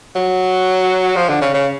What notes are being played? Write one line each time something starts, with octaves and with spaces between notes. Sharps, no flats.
F#3
F3
D3
C#3
C#3